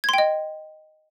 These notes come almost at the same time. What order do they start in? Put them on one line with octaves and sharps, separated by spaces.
G#6 C6 G5 D#5